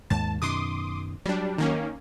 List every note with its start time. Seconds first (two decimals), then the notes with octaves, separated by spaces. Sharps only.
0.10 D#2 G#2 A5
0.42 F#2 B2 D#3 C6 D6 D#6
1.26 F#3 G3 D4
1.58 D#3 A#3 C#4